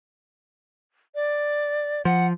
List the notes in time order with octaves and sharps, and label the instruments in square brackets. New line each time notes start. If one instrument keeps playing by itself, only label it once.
[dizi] D5
[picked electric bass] F3 [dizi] F#5